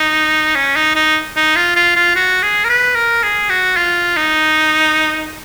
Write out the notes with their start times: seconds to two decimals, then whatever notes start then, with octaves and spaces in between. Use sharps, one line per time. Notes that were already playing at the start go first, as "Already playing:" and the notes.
Already playing: D#4
0.56 C#4
0.76 D#4
0.95 D#4
1.36 D#4
1.56 F4
1.76 F4
1.96 F4
2.16 F#4
2.43 G#4
2.64 A#4
2.69 B4
2.96 A#4
3.23 G#4
3.49 F#4
3.77 F4
4.17 D#4